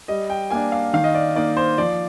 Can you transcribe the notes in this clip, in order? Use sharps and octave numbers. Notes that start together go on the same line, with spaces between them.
G3 D#5
G5
A#3 D4 G#5
F5
D#3 F5
D#5
D5
A#3 D#4 D5
C5
F3 D5